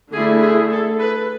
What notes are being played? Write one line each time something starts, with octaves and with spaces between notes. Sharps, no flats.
D3 A3 E4 G#4
G#4
A4
B4